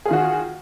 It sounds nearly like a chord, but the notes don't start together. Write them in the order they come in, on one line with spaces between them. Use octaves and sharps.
G#4 F4 D#3 F#4